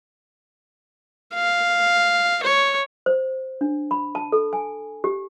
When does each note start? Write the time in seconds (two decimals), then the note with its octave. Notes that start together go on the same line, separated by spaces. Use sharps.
1.35 F5
2.44 C#5
3.06 C5
3.61 D4
3.91 B5
4.15 A5
4.32 A4
4.53 G#5
5.04 G4